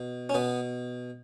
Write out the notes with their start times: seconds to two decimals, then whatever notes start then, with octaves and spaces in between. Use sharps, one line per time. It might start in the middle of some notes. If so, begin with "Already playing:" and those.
Already playing: B2
0.29 C#4
0.34 B2 B3